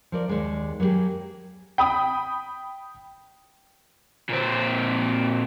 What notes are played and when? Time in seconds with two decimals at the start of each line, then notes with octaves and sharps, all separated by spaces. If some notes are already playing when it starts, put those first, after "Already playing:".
0.12 F3 A#4 D5
0.28 D#2 C#3 G#3 D5
0.80 F#3 A#3 B3 G4 G#4
1.78 G5 B5 D#6
4.30 A#2 C4